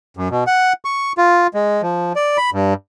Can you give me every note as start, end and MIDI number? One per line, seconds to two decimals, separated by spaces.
0.17 0.28 42
0.30 0.44 47
0.47 0.73 78
0.85 1.13 85
1.18 1.47 65
1.54 1.82 56
1.82 2.13 53
2.16 2.37 74
2.38 2.50 83
2.53 2.74 43